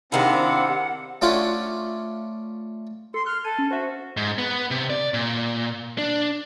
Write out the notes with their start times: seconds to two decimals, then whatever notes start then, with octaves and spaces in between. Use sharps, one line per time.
0.12 C3 D#3 C4 D4 E4 F5 F#5
1.22 A3 C#4 D4 F4 F#5
3.14 A4 C6
3.26 F6 F#6 G7
3.44 A4 G#6 D#7
3.59 C#4
3.71 F#4 C5 E5
4.17 G#2
4.38 B3
4.71 C3
4.90 D5
5.14 A#2
5.98 D4